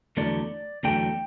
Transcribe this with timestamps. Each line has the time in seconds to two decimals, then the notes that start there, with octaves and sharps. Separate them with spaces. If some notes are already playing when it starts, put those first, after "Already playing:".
0.17 E2 D3 F#3 A3 D5
0.83 E2 D3 F#3 A3 G5